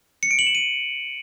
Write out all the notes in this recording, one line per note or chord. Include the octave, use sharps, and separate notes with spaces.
C#7
D7
F#7
E7
D#7